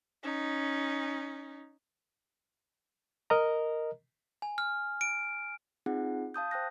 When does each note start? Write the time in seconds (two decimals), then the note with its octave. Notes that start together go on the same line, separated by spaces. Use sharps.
0.23 C#4 D#4
3.30 A#4 D#5 A#5
4.42 G#5
4.58 F6
5.01 D7
5.86 C4 D#4 F4 G#4 F#5
6.34 F5 A5 D#6 G6
6.51 C5 G5 A5 F#6 A#6